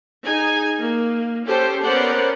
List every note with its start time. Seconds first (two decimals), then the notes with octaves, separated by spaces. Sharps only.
0.24 D#4 G#4 G#5
0.80 A#3
1.46 C#4 G4 A4 C5
1.83 B3 C#4 A#4 C5 D5 F#5